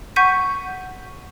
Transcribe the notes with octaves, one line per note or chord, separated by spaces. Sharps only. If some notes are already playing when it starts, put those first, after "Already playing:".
F#5 C#6 G6 B6 D#7